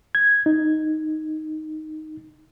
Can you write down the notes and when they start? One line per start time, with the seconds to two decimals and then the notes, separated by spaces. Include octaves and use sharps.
0.15 G#6
0.46 D#4